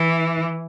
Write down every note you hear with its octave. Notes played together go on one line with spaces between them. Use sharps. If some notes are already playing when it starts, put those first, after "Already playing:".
Already playing: E3